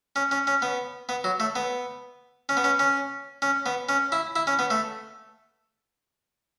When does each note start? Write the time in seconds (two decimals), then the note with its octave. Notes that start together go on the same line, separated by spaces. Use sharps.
0.16 C#4
0.31 C#4
0.47 C#4
0.62 B3
1.09 B3
1.24 F#3
1.40 A3
1.56 B3
2.49 C#4
2.57 B3
2.64 C#4
2.79 C#4
3.42 C#4
3.66 B3
3.89 C#4
4.12 E4
4.36 E4
4.47 C#4
4.59 B3
4.70 A3